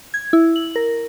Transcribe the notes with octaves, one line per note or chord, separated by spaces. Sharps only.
G#6
E4
F#7
A#4